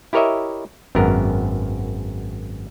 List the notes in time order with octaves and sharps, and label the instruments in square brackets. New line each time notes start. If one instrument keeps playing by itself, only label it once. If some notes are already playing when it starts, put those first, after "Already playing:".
[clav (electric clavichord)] E4 G4 A#4 C#5 D#5 E5
G#1 F#2 B3 A#4